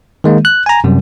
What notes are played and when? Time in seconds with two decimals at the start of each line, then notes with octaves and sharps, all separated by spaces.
0.24 D#3 G#3 A#3
0.45 F#6
0.66 G#5 A#5
0.84 F#2 C3 G3